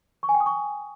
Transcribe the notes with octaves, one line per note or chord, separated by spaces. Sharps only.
C#6
G#5
G5
D#6
C#6